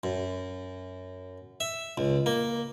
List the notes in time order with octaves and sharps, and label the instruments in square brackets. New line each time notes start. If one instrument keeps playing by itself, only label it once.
[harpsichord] F#2
E5
C#2
A#3